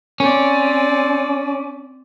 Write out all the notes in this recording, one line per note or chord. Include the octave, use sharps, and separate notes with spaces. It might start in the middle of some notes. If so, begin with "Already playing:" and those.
C4 C#4 D5